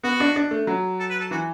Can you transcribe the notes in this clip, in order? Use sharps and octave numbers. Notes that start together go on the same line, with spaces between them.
B3 F#4
D4
D4
A3
F#3
A4
B4
A4
E3 F#4